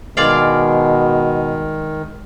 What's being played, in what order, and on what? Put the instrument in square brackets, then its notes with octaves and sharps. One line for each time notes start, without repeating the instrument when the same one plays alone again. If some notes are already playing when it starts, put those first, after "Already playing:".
[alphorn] B2 [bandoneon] D#3 [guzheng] G#3 D5 F5